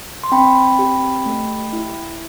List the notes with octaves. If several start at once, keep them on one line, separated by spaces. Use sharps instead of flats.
C6
C4 G5 B5
G4
A3
E4